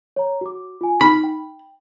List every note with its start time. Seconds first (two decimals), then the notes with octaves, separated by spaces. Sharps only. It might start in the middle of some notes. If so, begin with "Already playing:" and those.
0.16 C#5 A#5
0.41 F#4 D6
0.81 F4 G#5
1.01 D#4 B5 F6
1.24 G5